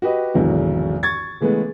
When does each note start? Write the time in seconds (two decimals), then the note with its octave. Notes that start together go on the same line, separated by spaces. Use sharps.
0.02 F#4 G4 B4 D#5
0.34 G#1 E2 B2 D3 F#3 G#3
1.03 C#6 G#6 A6
1.40 C#3 E3 G#3 A3 B3